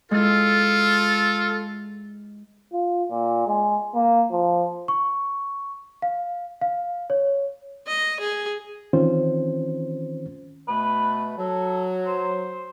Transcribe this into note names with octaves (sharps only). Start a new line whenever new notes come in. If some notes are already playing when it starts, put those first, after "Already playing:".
G#3 E4 F4 A4
F4
A#2
G#3
A#3
F3
C#6
F5
F5
C#5
D#5
G#4
D#3 E3 C4 C#4 F4 C5
B2 A3 B4
F#3 A4
C5